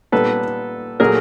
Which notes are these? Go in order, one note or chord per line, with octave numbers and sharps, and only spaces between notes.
A#2 G3 B3 A4 B4
A#2 F#3 A3 G#4 A#4